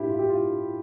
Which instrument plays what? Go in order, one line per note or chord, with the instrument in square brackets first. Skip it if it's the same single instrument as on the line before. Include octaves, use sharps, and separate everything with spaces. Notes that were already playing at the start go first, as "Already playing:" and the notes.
Already playing: [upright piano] A2 G3 E4 G4
F4
G4
F4